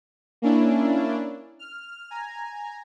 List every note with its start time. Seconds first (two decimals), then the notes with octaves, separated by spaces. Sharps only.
0.42 A#3 C#4 D4 E4
1.59 F6
2.10 G#5 A#5